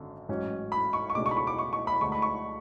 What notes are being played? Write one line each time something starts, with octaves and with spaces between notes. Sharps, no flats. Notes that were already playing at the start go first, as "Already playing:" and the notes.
Already playing: G#1 F#2 D3
A1 G#2 F#3 C#4
B5
C#6
C#6
C#2 B2 G#3 D4 D6
C#6
B5
C#6
D6
C#6
C#6
B5
D2 D3 G#3 C#6
B5
C#6